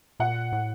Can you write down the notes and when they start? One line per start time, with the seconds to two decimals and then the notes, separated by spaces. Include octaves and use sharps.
0.20 A#2 F#5
0.52 A2